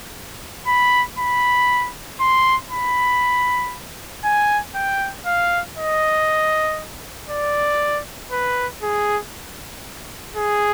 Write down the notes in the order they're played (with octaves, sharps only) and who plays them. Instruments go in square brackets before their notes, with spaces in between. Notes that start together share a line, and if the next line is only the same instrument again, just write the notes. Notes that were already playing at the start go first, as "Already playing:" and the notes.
[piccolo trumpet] B5
B5
C6
B5
G#5
G5
F5
D#5
D5
B4
G#4
G#4